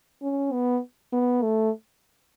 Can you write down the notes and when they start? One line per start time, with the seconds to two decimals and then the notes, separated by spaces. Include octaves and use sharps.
0.22 C#4
0.52 B3
1.13 B3
1.43 A3